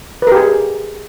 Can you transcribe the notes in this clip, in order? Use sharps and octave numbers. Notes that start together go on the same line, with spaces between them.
G4 G#4 A#4 B4